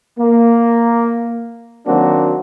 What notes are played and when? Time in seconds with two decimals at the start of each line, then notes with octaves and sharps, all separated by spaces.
0.20 A#3
1.87 D#3 F#3 A#3 C4 D4 F#4